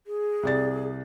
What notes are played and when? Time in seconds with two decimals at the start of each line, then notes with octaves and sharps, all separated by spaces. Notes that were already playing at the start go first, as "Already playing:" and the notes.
0.07 G#4
0.43 C2 D5 A6